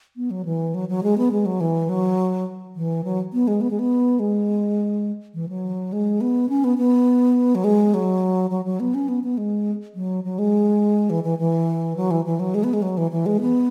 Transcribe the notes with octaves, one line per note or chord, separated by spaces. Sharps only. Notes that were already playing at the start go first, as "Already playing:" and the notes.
B3
F#3
E3
F#3
F#3
G#3
B3
G#3
F#3
E3
F#3
E3
F#3
B3
G#3
B3
G#3
B3
G#3
E3
F#3
G#3
B3
C#4
B3
B3
F#3
G#3
F#3
F#3
F#3
B3
C#4
B3
B3
G#3
F#3
F#3
G#3
E3
E3
E3
F#3
E3
E3
F#3
G#3
B3
G#3
F#3
E3
E3
G#3
B3